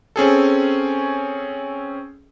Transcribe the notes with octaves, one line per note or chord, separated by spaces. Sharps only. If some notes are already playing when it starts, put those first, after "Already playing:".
C4 C#4 G#4 A4